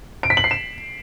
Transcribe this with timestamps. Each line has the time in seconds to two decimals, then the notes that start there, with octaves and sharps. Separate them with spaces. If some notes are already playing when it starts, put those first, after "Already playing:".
0.23 D7
0.30 B6
0.37 F#7
0.44 C7
0.51 E7